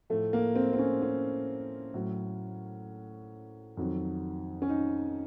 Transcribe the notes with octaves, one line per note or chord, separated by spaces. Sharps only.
A2 F3 A3
A#3
C4
C4
C#4
C#4
A2 F#3
F2 D#3 F#3
C#4
D#4